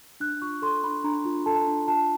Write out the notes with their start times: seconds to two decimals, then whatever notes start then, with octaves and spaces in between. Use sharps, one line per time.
0.20 D4 F#6
0.41 F4 C#6
0.62 A4 C6
0.83 D4 B5
1.04 D4 A#5
1.25 F4
1.46 A4 A5
1.67 D4
1.87 F4 A5